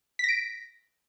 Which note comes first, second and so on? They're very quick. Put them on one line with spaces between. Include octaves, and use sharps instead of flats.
B6 A#6 D7